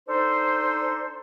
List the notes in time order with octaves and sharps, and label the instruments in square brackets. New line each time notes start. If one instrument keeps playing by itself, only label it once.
[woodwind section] D4 D#4 A4 C5